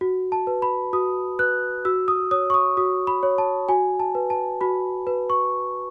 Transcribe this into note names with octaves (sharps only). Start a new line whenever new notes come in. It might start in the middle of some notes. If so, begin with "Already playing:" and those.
F#4
A5
B4
B5
F#4 D#6
B4 F#6
F#4 E6
D#6
C#5 D#6
C#6
D#6
F#4 D#6
B5
C#5
A5
F#4 G#5
A5
B4
A5
F#4 B5
B4
C#6